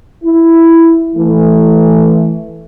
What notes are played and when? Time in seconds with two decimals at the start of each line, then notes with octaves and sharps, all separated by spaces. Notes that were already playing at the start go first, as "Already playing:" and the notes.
0.24 E4
1.15 E3 A3